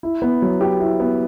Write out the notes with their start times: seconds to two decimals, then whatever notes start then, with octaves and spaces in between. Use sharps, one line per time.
0.03 E4
0.22 B3
0.42 F#3
0.61 G4
0.80 E4
1.00 B3